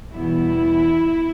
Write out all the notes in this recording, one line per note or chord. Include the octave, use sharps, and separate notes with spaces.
E2 B2 G3 B3 E4